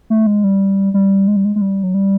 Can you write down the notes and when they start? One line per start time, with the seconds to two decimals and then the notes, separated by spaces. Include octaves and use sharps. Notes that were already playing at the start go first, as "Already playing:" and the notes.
0.10 A3
0.27 G#3
0.44 G3
0.94 G3
1.27 G#3
1.36 G3
1.45 G#3
1.56 G#3
1.61 G3
1.83 F#3
1.94 G3